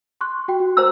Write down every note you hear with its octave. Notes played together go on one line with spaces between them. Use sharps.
C6 C#6 F#6
F#4 G5
F#4
C5 A#5 E6